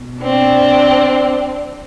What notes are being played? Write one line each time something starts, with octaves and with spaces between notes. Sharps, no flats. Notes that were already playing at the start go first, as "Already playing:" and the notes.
Already playing: B2
C4 D4